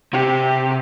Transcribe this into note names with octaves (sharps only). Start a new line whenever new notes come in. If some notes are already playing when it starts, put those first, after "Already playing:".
C3 G4